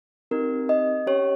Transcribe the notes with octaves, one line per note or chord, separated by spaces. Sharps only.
C4 D#4 G4 A#4
D#5
C#4 G4 C#5